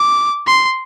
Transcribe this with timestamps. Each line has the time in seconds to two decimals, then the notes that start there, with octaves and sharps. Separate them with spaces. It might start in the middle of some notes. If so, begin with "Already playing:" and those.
Already playing: D6
0.47 C6